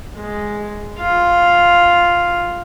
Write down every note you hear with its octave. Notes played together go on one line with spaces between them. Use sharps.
G#3
F4 F5